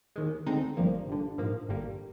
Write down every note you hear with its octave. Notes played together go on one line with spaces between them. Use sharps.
D#2 D#3 G#3
D2 D3 G#3 C4 D#4
G1 G2 F3 A#3
G1 G2 D3
A#1 G#2 F3 A#3
G1 G2 D3 G3 A#3